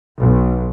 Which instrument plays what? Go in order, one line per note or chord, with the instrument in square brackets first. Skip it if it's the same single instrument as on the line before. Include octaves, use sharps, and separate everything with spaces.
[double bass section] B1